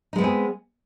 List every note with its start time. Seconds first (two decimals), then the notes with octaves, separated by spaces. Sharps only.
0.13 D#4
0.16 G#3
0.18 B3
0.21 C4
0.24 G#4